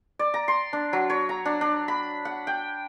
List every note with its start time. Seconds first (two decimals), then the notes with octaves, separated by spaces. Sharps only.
0.19 D5
0.34 A#5
0.48 C6
0.73 D4
0.93 F#3
1.10 C#5
1.29 A#5
1.45 D4
1.61 D4
1.88 B5
2.25 F#5
2.47 G5